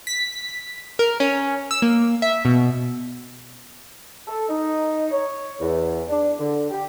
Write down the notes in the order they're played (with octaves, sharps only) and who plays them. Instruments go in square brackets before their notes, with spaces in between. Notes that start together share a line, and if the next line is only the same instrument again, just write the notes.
[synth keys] B6
A#4
C#4
E6
A#3
E5
B2
[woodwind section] A4
D#4
C#5
E2
D4
D3
G4